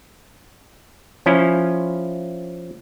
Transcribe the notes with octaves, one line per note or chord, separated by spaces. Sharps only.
F3 C#4 E4